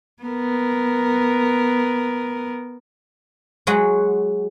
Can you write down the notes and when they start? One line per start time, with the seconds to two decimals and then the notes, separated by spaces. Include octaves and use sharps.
0.23 B3 A#4
3.67 F#3 G#3 F#4